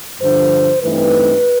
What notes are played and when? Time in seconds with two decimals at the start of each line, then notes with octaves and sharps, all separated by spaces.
0.20 G2 D3 F3 C5
0.83 G2 E3 A3 C4 D#4 B4